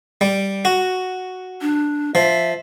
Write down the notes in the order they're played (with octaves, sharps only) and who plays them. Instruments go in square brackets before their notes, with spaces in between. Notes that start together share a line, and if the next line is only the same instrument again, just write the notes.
[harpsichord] G3
F#4
[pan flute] D4
[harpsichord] F3 [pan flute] E5